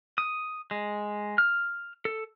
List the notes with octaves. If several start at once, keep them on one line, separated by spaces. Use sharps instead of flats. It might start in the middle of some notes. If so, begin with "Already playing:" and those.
D#6
G#3
F6
A4